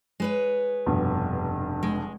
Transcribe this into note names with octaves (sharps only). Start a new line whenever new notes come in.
G#3 B4 C#5
F1 G2 B2
G#3